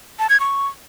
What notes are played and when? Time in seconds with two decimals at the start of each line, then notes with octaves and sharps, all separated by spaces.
0.19 A5
0.30 G#6
0.40 C#6